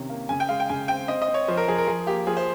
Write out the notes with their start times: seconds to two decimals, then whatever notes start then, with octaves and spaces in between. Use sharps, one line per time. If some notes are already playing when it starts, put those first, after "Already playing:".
Already playing: C3 D#3 C#4
0.09 A#3
0.29 C#3 G#5
0.40 G5
0.49 G#3 F5
0.60 G5
0.69 C#3 G#5
0.88 C4 G5
1.08 C4 D#5
1.22 D#5
1.28 C4
1.34 C#5
1.48 F3 C5
1.57 A#4
1.68 F3 G#4
1.78 A#4
1.87 F3 G#4
2.07 A#3 G4
2.27 F3 G#4
2.37 C5